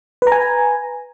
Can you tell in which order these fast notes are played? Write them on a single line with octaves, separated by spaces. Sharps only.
B4 A#5 G#5